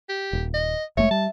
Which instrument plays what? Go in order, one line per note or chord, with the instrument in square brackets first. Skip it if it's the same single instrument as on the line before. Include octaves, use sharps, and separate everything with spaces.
[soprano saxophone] G4
[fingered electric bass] D#1
[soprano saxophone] D#5
[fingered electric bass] F1 G#3 A3 [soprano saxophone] C#5 [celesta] E5
[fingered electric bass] G3 [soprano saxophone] A5